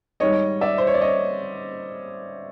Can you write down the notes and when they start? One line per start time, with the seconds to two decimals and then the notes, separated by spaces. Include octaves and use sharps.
0.20 G#2 D#3 G3 C#5 D#5
0.61 D5 E5
0.78 C5
0.87 C#5
0.94 D5
1.02 C#5 D#5